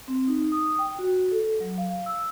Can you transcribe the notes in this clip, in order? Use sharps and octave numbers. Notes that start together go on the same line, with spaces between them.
C4
D#4
D#6
G5
F#4
A4
F#3
F5
E6